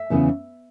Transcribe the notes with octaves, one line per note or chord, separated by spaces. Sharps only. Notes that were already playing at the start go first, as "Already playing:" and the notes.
Already playing: E5
E2 C#3 E3 B3